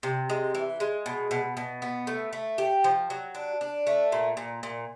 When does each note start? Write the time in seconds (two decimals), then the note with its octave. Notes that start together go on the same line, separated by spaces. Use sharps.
0.03 C3
0.30 G#3
0.55 E3
0.80 G#3
1.06 B2
1.31 B2
1.57 B2
1.82 B3
2.07 A3
2.33 A3
2.58 G4
2.84 F3
3.10 F#3
3.35 D4
3.61 D4
3.87 A3
4.12 A#2
4.37 A#2
4.63 A#2